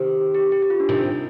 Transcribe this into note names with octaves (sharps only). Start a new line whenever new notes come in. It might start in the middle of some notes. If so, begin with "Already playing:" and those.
Already playing: C3 D#3
G4
G4
G4
F4
D4
C3 D#3 D#4